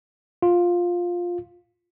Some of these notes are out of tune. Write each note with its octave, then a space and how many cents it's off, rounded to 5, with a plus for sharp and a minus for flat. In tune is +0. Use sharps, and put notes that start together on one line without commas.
F4 +10